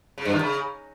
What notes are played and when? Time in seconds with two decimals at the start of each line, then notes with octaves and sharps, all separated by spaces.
0.18 C#3
0.25 G2
0.33 D#3
0.41 C#3